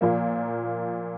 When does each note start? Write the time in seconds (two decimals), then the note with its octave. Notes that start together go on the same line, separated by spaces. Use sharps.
0.01 A#2 F3 A#3